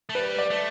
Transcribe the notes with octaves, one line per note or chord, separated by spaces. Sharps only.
A3
G3 B4
D5
A3